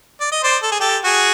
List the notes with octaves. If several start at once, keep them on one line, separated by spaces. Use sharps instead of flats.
D5
D#5
C5 D5
A4
G#4
G4 A4
F#4 G#4